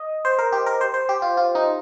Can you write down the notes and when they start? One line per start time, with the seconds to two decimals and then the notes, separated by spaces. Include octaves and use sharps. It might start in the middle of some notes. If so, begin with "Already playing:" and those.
Already playing: D#5
0.25 C5
0.38 A#4
0.52 G4
0.66 A#4
0.81 C5
0.94 C5
1.09 G4
1.22 F4
1.37 F4
1.55 D#4